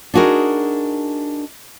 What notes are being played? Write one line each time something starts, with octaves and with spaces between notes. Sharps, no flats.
D4 D#4 F#4 G#4 A#4